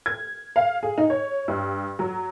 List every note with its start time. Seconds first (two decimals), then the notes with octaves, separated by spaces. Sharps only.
0.06 G#6
0.56 F5
0.83 G#4
0.98 D#4
1.10 C#5
1.48 G2
1.99 F#3